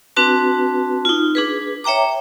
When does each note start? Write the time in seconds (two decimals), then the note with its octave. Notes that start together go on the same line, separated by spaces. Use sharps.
0.16 C4 D4 F#4 B4 A5
1.05 D#4 F4
1.35 D4 G#4 B4
1.84 C#5 E5 G5 A#5 D6